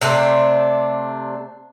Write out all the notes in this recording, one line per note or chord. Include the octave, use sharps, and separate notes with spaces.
C3 A3 C4 D4